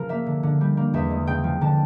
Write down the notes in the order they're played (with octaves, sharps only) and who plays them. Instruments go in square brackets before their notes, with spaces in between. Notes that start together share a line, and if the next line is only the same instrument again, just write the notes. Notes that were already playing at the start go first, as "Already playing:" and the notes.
Already playing: [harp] C#3 F3 A#4
A#3 E5
D3
D3
G3
A#3
E2 E5
G#3
C#3 G5
F3
D3 A5